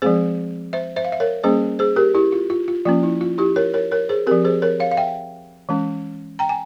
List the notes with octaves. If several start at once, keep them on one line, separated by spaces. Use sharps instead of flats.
F3 G#3 C4 G#4 C5
C5 E5
C5 E5
F5
E5
A#4 C#5
G3 A#3 C#4 G#4 C5
G#4 C5
G4 A#4
E4 G4
F4
F4
F4
F3 A#3 C#4 F4
E4
F4
E4 G4
A#4 C#5
A#4 C#5
A#4 C#5
G#4 C5
F3 C4 G4 A#4
G#4 C5
A#4 C#5
C#5 F5
F5
E5 G5
E3 G#3 C#4
G5 A#5
G#5